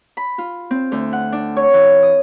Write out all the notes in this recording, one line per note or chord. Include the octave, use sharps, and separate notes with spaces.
B5
F4
C4
D2
F#5
D4
C#5
E3
D#6